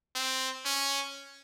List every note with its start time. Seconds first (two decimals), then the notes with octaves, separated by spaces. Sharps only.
0.15 C4
0.66 C#4